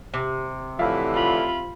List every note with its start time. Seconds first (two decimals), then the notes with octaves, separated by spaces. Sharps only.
0.14 C3
0.79 A2 D3 E3 F3 E5 F5
1.15 F4 B5